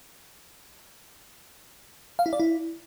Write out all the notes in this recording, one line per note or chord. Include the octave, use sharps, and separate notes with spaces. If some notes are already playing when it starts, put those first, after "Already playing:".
F5
E4
D5
E4